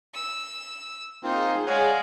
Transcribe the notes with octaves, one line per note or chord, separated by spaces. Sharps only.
E6
A#3 C4 D#4 F4 G#4 C5
G#3 C#5 D5 F5 F#5 G#5